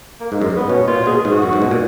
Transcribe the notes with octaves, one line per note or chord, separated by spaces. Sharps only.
A#3
G#2 G#3
F#2 G#3
G#2
B3
B2 C#4
A#2 F4
B2 G#4
G#4
G#2
F#4
F#2
G#2
B2
A#2